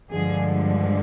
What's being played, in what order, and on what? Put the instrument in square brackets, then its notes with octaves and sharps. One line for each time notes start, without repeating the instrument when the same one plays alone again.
[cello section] G2 D3 F3 G#3 G#4